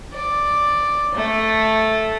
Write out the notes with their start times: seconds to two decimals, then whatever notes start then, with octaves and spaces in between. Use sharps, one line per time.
0.13 D5
1.15 A3